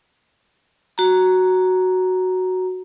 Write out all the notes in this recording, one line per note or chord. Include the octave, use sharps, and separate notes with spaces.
F#4 A#5